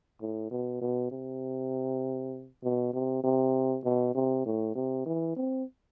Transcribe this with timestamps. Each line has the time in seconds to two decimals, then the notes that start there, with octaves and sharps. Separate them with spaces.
0.21 A2
0.51 B2
0.81 B2
1.11 C3
2.64 B2
2.93 C3
3.24 C3
3.85 B2
4.15 C3
4.46 A2
4.75 C3
5.06 E3
5.36 C4